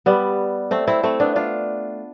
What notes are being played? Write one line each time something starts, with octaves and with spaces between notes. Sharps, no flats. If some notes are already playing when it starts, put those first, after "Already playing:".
G3 B3
A3 C4
C4 E4
A3 C4
B3 D4
D4 F4